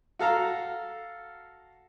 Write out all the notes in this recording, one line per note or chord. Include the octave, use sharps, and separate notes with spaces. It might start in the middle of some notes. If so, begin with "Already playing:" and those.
F#4 A4 F5 A#5